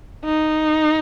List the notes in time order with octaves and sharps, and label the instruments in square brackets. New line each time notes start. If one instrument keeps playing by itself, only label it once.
[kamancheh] D#4